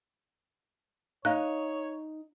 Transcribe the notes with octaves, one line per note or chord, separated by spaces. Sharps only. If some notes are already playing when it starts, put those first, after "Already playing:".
D#4 C#5 F5 F#6